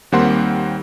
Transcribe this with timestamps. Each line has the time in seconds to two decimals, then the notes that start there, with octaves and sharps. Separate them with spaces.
0.12 D#2 G3 A#3 C4 F#5 C6